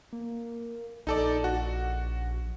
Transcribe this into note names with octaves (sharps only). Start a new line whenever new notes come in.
A#3
A#1 D#4 A4 D5
F#4